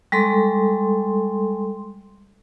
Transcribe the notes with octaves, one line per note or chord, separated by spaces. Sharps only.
G3 G#3 A4 C6